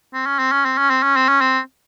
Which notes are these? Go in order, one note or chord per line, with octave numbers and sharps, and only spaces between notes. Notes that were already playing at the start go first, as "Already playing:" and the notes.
C4
C#4
C4
C#4
C4
C#4
C4
C#4
C4
C#4
C4